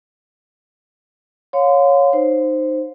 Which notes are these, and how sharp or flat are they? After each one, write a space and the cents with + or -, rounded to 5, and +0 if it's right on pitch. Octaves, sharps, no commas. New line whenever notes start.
C#5 +0 F5 +25 C6 -30
D#4 -20 C5 +0